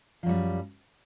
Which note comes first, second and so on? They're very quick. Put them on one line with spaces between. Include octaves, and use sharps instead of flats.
F3 F#2 G3